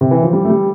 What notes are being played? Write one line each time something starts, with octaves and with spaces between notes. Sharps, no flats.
C3
E3
F3
G3
A3
G3